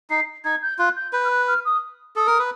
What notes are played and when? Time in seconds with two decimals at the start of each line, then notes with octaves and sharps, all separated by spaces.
0.10 D#4 C7
0.45 D#4 G#6
0.63 G6
0.79 F4 F#6
0.96 G6
1.13 B4 G6
1.24 F6
1.30 F#6
1.47 F6
1.65 D#6
2.16 A4 D#6
2.27 A#4
2.39 B4